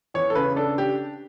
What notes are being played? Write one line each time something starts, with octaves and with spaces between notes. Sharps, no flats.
E2 C#5
A4
C#3 B4
D4 A4
G4